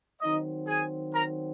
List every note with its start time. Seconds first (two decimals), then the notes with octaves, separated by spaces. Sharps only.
0.21 D#3 F#3 C4 D#4 D#5
0.67 G#4 G#5
1.13 A#4 A#5